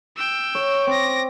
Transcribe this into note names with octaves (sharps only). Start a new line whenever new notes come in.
G5 E6
C#5
C4 D6 A#6